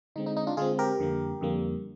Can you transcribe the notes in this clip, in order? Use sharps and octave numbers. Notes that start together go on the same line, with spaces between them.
D3 G#3 C4 D#4
D#4
D#4
D4 F4
D3 G#3 C4 F4 G#4
G4 A#4
F2 D3 G3 A#3
F2 D3 G3 A#3